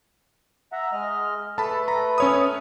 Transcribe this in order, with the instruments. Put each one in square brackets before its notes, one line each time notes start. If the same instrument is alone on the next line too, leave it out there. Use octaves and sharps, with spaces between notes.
[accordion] E5 F#5 A#5
G#3 D#5 F6
[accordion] A3 A4 B4 [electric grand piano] A5 B5
[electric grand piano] A#5
C#4 C#5 D#6